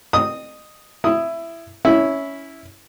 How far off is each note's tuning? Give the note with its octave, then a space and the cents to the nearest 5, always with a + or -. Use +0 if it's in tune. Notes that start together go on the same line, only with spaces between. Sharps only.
D#5 -30 D#6 +0
E4 +15 D#6 +0
C#4 +10 E4 -10